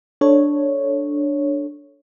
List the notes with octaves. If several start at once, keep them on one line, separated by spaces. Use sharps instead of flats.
D4 A4 C#5